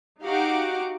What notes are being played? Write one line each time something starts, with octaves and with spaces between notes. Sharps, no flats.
D#4 F#4 G4 F5 F#5 D6